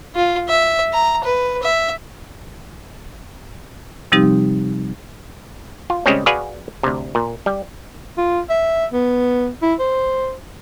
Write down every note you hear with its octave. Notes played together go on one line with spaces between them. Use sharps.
F4
E5
A#5
B4
E5
C3 F3 G3 C4 D#4 G4
F4
C#3 G3 G#3 C4 C#4
F#4 G#4 B4 D5 F5 G#5
D2 C3
A#2
G3
F4
E5
B3
E4
C5